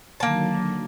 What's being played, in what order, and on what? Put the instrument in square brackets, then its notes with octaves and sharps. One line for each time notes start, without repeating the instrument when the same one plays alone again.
[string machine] D3 D#3 F#3 [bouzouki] A#3 A5